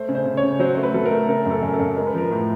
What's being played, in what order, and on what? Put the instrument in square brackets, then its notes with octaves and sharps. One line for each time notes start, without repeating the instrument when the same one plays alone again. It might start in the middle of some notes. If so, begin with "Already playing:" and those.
Already playing: [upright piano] A3 C5
C#3
C5
C#3
C#5
C#3
F#3 C5
A3 C5
B4
F#3 A4
A#4
A3
C#3 A#4
F#2
A4
F#2
A4
F#2
G#3 A#4
B4
F3 A#4
A2